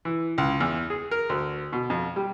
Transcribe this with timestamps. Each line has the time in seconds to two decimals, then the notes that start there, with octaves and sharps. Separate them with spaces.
0.05 E3
0.38 C#2
0.60 E2
0.90 G#4
1.11 A#4
1.29 D2
1.73 B2
1.90 F2
2.16 G3